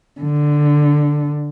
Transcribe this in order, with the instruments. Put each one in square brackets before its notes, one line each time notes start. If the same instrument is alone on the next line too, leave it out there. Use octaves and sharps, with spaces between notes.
[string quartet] D3